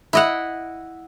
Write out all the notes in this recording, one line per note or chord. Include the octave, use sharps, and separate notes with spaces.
E4 D#5 F#5